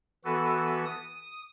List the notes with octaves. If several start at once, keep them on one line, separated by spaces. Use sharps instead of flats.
E3 B3 F#4 A4 B4
D#6